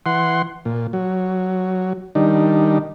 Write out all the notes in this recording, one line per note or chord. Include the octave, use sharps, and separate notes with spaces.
E3 F#5 C6
A#2
F#3
D#3 G3 D4 D#4